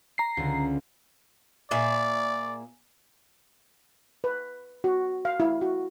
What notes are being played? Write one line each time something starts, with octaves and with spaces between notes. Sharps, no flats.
A#5 C7
C#2 D3
A#2 G#4 D5 E5
B4
F#4
F5
E4
F#4